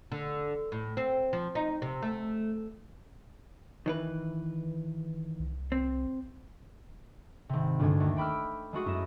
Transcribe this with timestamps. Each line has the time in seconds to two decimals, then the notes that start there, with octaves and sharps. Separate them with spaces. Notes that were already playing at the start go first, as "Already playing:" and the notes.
0.12 D3
0.72 A2
0.97 C4
1.33 F3
1.55 D#4
1.82 C3
2.02 A3
3.86 D#3 E3 B4
5.40 C2
5.72 C4
7.49 G#1 C3
7.79 D2 G2 D3 G#3 G#6
8.00 D#2 A3
8.17 G5 B5 D6 E6 F6
8.73 G#3 A3 F#4 G#4
8.85 F#2 E4 D#5 E7